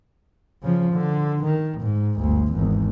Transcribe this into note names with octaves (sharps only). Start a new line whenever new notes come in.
C#3 F3
D3
D#3
G#2
G1 D2
G#1 E2